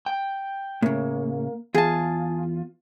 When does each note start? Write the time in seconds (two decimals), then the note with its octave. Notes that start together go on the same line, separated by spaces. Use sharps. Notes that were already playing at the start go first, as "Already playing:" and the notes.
0.06 G5
0.82 A2 C#3 A#3
1.75 E2 F4 G#4 A5